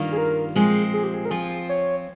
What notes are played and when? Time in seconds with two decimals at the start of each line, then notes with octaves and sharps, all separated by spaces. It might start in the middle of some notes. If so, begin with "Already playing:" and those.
Already playing: G2 D#3 A#3 F4
0.12 G#4
0.18 A#4
0.56 A#2 F3 G#3 C4 G#4
0.93 G#4
1.04 G4
1.14 G#4
1.25 A#4
1.30 F3 C4 F4 G#4
1.69 C#5